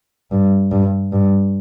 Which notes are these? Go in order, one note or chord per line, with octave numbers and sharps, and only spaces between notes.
G2
G2
G2